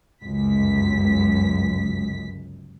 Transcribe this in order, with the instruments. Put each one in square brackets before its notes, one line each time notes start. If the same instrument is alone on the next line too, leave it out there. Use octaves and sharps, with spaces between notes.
[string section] G1 C#2 F#2 B6